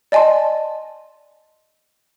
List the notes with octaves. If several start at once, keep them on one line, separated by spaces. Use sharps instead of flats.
D5 D#5 G#5 A5 C6